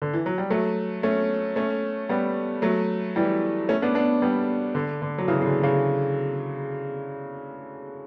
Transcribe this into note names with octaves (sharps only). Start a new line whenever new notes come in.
D3
E3
F#3
G3
F#3 A3
A3 C#4
A3 C#4
G3 B3
F#3 A3
E3 G3
A3 C#4
B3 D4
B3 D4
G3 B3
D3
D3
F#3
C#3 E3
C#3
D3
C#3